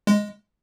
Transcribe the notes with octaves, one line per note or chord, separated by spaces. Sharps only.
G#3